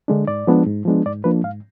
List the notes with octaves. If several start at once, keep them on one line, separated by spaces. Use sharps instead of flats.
D3 G#3 D4
G#2 D5
F3 G#3 B3 D4
G#2
F3 G#3 B3 D4
G#2 D5
F3 A#3 D4 B4
G#2 F5